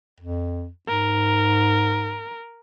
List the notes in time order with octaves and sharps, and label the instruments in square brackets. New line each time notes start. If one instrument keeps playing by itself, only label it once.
[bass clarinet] F2
[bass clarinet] G#2 [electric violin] A#4